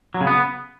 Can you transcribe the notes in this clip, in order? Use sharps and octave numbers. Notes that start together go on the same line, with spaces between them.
F#3
C#3
B3